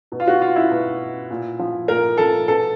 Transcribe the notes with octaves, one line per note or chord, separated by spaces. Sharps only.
B2
F4
F#4
F4
E4
B2
A#2
F3
A#2 A#4
F3 A4
B2 A4